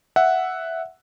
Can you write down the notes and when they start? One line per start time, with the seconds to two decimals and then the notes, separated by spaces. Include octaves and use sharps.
0.16 E5 F#5